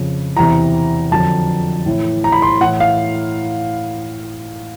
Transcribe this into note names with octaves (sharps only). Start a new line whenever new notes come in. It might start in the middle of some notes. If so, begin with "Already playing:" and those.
Already playing: F2 C#3 F3
E2 C3 E3 A#5
F2 D3 F#3 A5
A2 E3
A#5
B5
C6
A2 E3 F#5
F5